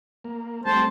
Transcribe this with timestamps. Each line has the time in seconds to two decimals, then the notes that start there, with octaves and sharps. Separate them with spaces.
0.24 A#3
0.66 G3 A3 C4 C5 A5